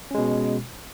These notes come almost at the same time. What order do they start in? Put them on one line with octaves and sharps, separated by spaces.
C#4 G#3 B2